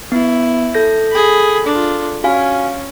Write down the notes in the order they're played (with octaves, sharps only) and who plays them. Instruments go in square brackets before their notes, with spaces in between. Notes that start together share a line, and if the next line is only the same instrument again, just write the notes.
[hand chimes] B3 [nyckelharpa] E4
[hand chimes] A4 G6 A#6
[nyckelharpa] G#4 B5
D4 F4
[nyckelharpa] C#4 [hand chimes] F#4 F5 G#5